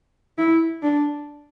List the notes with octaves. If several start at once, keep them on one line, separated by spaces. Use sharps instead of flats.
E4
D4